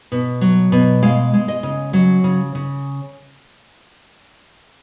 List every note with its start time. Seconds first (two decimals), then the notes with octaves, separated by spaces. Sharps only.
0.12 B2
0.41 F#3
0.72 B2
1.02 G#3 F5
1.33 G#3
1.48 D#5
1.63 C#3
1.93 F#3
2.24 C#3
2.55 C#3